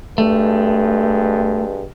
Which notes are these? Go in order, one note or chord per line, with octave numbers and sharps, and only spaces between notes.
G2 B2 G#3 A3